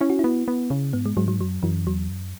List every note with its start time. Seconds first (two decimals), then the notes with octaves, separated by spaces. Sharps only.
0.01 C#4 E4
0.10 F#4
0.19 B3 E4
0.48 B3
0.70 C#3
0.93 G#2 B3
1.06 G#3
1.17 G#2 F#3
1.28 F#3
1.40 F#2 F#3
1.63 F#2 E3
1.86 E2 F#3
2.09 F#2